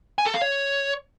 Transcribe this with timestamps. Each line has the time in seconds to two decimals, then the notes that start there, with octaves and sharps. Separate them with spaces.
0.18 G#5
0.26 A4
0.34 F5
0.42 C#5